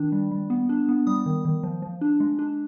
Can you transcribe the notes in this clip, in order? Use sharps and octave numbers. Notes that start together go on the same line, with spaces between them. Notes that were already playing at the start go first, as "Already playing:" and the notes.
Already playing: D#3 D4
G3
G3
B3
D4
B3
G3 D#6
D#3
D#3
F3
F3
D4
G#3
D4